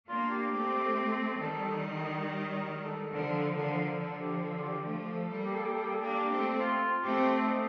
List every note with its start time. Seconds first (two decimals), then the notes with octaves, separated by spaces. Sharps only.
0.09 A#3 D4 F4
0.30 G4
0.52 A3 C4
1.39 D#3 G3 A4
2.26 A#4
2.56 A#4
2.84 A4
3.12 D3 F3 A#4
3.35 C5
3.56 D3 F3 A#4
3.78 A#4
3.99 D3 F3 A4
4.21 G4
4.43 A4
4.61 F4
4.65 G4
4.86 F3 A3
5.16 A4
5.30 G3 A#3
5.45 G4
5.55 A4
5.64 G4
5.74 G3 A#3 A4
5.84 G4
5.95 A4
6.02 A#3 D4 G4
6.31 A3 C4
6.60 F4
7.04 A3 C4 G4
7.47 D#4